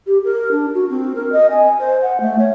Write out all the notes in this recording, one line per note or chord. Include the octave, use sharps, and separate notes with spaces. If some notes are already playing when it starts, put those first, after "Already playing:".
G4
A#4
D4
F#4
C4
A#4
D#5
G#5
C5
F#5
A3
C#5